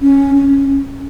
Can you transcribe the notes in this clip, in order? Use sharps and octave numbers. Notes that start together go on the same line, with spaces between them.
C#4
C#4